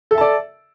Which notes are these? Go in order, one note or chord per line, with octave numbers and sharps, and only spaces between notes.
A4 D5 E5 A5